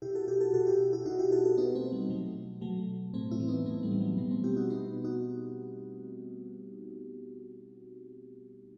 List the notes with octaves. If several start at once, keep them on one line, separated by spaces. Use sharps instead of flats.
B2 E4 G4
F#4 A4
E4 G4
F#4 A4
B2 F#4 A4
E4 G4
E4 G4
B2 D#4 F#4
E4 G4
F#4 A4
F#4 A4
B2 B3 D#4
A3 C4
G3
B2 F#3 A3
B2 F#3 A3
A2 A3 C4
C4 E4
E3
B3 D#4
A2 A3 C4
G3 B3
E3
F#3 A3
B2 G3 B3
A3 C4
E4 G4
D#4 F#4
B2 B3 D#4
D#4 F#4